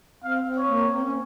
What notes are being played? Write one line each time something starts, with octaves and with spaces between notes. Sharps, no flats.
C4 F5
C4
C#5
A#3
C4
C#4